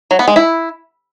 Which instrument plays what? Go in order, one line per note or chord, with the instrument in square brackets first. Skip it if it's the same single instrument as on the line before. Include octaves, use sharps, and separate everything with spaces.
[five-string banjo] F#3
B3
G#3
E4